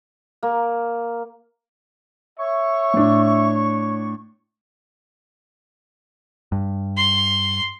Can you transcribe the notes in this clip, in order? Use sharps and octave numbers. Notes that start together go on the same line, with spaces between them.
A#3
C#5 E5 C#6
A2 D4
G2
C6